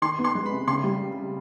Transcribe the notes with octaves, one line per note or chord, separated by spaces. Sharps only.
D#3 C6
B3
C6
G#3
B5
C3
C#3 C6
G3